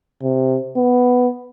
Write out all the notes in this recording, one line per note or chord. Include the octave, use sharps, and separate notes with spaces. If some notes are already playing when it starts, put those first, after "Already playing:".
C3
B3